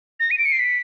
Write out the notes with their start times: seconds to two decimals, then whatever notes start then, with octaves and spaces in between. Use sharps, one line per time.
0.20 A#6
0.31 D#7
0.38 D7
0.45 C#7
0.52 C7
0.59 B6